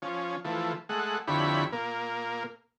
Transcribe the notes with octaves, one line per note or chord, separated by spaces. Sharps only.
F3 C#4
E3 F3 A3
G#3 A3 F#5
F2 D3 E4 G4 C#5 B5
A#2 A#3